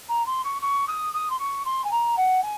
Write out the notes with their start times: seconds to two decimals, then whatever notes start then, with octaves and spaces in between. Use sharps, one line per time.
0.08 A#5
0.26 C6
0.43 C#6
0.61 C#6
0.87 D#6
1.13 D#6
1.29 C6
1.38 C#6
1.65 C6
1.84 G#5
1.91 A#5
2.16 F#5
2.42 G#5